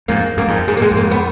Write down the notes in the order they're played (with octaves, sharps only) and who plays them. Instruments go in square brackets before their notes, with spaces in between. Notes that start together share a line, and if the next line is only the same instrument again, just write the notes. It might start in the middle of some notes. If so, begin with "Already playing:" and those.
[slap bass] F2 G#2 [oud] A#3
[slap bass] F#2 [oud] A#3
[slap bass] F2 G#2
[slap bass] G#2 [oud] G#3
[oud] A#3
[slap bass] A#2 [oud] G#3
[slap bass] F2 G#2
[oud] A#3
B3